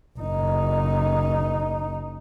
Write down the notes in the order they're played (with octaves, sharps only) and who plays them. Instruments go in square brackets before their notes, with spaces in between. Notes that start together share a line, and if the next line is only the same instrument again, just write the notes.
[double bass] F#1 D#4